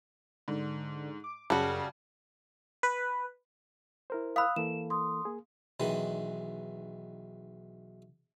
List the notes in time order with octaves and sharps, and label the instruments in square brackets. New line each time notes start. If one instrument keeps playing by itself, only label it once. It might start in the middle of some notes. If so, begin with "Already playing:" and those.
[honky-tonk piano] G#2 [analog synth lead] D3
[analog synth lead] D6
[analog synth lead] F#2 [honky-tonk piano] C#3 A5 [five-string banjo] G3 F#4
[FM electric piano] B4
[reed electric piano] E4 A#4 C5
[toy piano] F5 B5 [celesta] D#6 E6 F#6
[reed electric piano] E3 A#3 A4 [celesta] E7
[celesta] C6 D#6
[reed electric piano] A#3 G#4
[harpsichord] B1 D#3 E3 G#3